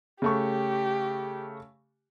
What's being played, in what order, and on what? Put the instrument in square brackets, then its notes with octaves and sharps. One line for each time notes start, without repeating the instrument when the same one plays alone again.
[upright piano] C#3 A3 C#6 [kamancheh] G4